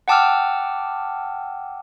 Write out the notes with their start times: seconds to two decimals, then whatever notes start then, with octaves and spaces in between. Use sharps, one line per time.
0.08 F#5 G5 A5 D6 E6 F6